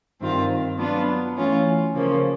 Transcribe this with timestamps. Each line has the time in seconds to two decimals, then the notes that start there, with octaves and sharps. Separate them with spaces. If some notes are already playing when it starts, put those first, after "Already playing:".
0.21 G2 D#3 G3 C4 F4
0.78 F#3 B3 D4 F4
1.36 E3 A3 C#4 F4
1.93 C#3 F3 A#3 C#4